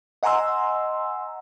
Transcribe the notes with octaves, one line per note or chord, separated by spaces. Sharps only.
D#5 F#5 G#5 A#5 C6 E6